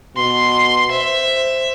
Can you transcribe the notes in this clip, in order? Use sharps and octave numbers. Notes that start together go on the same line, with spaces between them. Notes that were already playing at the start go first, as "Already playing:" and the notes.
B2 C6
C5 E5